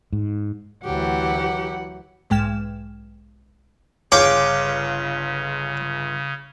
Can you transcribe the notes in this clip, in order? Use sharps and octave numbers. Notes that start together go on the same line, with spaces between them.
G#2
D2 E3 F#3 G4 F#5
B1 G#2 G#3 G5 F6 E7
G1 C#3 G#4 C#5 F5 G5 D6